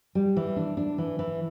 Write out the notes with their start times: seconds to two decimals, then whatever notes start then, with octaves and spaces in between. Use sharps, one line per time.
0.15 G3
0.37 E3
0.56 D4
0.77 D4
0.98 E3
1.19 E3